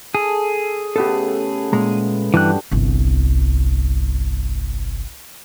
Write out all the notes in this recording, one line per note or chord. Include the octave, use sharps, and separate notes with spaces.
G#4 A4
C#3 A3 B3 G4 A4
A#2 G#3 A#5
G2 E3 D4 F#4 G4 F#6
G1 C2